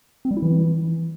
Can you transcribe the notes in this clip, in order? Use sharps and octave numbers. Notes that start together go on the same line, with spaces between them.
C4
G3
E4
E3